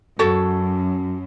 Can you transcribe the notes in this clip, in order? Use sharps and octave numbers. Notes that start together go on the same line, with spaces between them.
F#2 F#4 A4 C#5